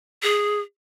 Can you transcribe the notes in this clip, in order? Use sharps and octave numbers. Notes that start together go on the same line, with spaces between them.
G#4